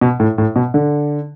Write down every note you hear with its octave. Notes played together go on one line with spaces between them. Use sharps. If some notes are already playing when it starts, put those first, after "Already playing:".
B2
A2
A2
B2
D3